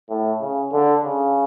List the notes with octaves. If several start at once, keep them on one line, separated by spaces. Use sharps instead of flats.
A2
C#3
D3
C#3